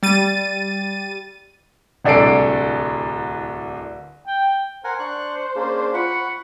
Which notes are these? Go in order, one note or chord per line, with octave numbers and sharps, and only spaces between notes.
G3 A6 D#7
D1 C2 D4 A4 C7 D7
G5
A#4 C5 F#5 G#5
D4 C#6 F#6
A#3 C#4 D4 G#4
F4 F#5 B5 C#6 C#7